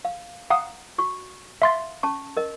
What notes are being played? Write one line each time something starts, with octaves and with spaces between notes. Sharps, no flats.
F5
F5 F#5 A#5 D#6
F#4 C#6
E5 F5 C6 A6
C#4 A5 C#6
A#4 D#5